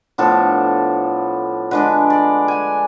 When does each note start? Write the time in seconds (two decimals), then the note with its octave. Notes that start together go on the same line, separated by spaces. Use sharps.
0.18 A2 F3 B3 D4 A4
1.71 D3 G#3 D4 B4
2.10 D5
2.48 G#5